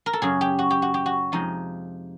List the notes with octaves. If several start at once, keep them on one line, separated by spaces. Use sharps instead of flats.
A#4
A4
F#2 C#3 F#3 G#4
G4
F#4
G4
F#4
G4
F#4
F2 C3 F3 G#3 D#4